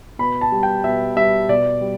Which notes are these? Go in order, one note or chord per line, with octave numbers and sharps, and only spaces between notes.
B2 B5
A5
G3
G5
B2 E5
G3 E5
B2 D5
G3